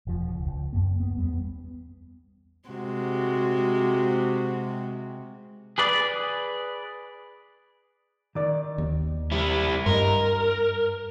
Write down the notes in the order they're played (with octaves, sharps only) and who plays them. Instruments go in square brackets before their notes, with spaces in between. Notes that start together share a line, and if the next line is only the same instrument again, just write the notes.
[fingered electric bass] E1 F3
C#2
C#2
F#2 A#3
B3
E2 G3 B3
[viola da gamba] C3 G#3 F#4
[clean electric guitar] G#4 B4 D5
[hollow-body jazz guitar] D#3 D5
[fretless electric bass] D#2
[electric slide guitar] G3 E4
[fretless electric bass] G2 [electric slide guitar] A#4 [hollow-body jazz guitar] D#5 C6